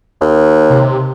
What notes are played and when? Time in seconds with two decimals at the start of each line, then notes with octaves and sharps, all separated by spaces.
0.21 D#2
0.70 C3